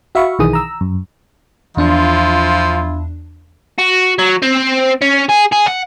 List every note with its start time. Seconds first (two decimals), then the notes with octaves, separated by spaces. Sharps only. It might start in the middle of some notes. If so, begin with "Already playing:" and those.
0.15 F#4 E5 F5 B5 C#6
0.39 B1 D#3 E3 G#4 D#6
0.53 A#5 E6
0.81 F#2
1.77 E2 F3 D4 E4 F4
3.78 F#4
4.19 F#3
4.43 C4
5.02 C#4
5.29 G#4
5.52 G#4
5.67 F#5